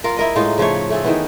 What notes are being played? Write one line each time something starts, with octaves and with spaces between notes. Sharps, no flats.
F4 A#4
E4 A#4 D#5
A2 G#3 D#4 F4
C#3 F3 A3 C#5
A3 G#4 A4
D#3 E3 B3